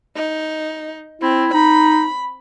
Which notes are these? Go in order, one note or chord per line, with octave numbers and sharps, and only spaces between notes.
D#4
C4 E4
D#4 B5